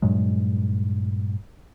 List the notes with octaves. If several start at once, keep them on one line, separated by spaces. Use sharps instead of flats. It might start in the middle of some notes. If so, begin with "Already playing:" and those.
G2 A#2 F#3 G#3